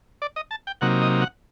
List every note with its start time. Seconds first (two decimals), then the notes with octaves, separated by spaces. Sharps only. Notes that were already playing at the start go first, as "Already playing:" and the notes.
0.22 D5
0.36 D#5
0.51 A5
0.67 G5
0.81 C3 F#3 A#3 D#4 F#5
1.02 D#5
1.22 F#5